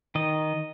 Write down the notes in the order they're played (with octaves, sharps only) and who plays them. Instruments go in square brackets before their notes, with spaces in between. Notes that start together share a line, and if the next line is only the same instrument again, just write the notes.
[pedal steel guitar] D#3 D#5